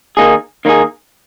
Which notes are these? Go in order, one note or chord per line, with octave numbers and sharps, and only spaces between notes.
D#3 A#3 D#4 G#4
D#3 A#3 D#4 G#4